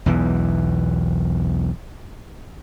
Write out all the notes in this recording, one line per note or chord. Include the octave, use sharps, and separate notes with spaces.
B1 E2 E3